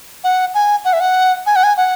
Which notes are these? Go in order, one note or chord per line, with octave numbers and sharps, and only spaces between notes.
F#5
G#5
F#5
E5
F#5
G#5
F#5
G#5
F#5